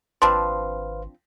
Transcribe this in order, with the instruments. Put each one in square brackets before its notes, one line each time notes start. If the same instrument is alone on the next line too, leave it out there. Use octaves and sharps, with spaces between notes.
[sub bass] G#1 [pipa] F3 C4 D4 [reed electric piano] B4 C5 F5 [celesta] C6